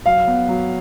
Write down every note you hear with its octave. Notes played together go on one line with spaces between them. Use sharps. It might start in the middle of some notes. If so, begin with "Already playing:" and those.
F#3 F5
B3
F#3